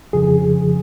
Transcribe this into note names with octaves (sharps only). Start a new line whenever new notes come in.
F2 C#3 F3 G#4